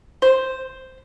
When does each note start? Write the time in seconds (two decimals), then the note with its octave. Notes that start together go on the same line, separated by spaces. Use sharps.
0.22 C5